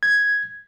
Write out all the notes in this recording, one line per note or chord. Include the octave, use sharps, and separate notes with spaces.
G#6